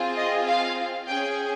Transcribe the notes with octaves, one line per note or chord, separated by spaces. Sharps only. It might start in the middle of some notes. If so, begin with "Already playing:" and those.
Already playing: C4 F4 G#4
D#5
F5
C#4 G#4 G5